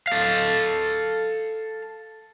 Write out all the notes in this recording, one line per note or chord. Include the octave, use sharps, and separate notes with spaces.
A4 F5